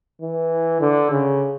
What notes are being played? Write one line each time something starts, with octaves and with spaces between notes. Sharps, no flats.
E3
D3
C#3